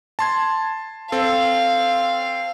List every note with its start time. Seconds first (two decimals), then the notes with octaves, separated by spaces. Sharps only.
0.19 A5 C6 G#6
1.12 C4 A4 F5